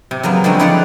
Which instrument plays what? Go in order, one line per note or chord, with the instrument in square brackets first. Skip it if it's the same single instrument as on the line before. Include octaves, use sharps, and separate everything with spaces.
[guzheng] C3
C#3 F#3 A#3 B3
D3 F3 G#3 A3 C4
D#4 E4 G#4 D5 F5 F#5